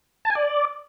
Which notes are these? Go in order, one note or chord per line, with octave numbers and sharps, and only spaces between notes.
A5
G#5
D5